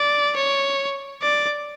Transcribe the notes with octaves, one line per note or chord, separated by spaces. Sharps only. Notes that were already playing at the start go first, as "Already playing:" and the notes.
Already playing: D5
C#5
D5